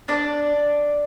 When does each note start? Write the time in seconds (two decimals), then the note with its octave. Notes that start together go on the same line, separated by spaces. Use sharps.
0.08 D4 D5